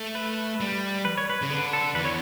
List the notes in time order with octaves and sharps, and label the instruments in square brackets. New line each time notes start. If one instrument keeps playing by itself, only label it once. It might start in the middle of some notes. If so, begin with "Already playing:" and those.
Already playing: [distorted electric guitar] A3
[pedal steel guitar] B4
[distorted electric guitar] G3
[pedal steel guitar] B4
C#5
B4
[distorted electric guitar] C#3
[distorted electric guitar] D3 [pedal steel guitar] B4
[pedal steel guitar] A4
[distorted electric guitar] E2 [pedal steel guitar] B4
[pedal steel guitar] C#5